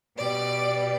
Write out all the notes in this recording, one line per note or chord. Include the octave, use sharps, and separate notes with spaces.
B2 G3 D5